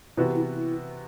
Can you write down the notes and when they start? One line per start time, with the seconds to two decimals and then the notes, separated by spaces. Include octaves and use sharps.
0.17 C3 E3 B3 E4 F#4
0.35 E4
0.53 E4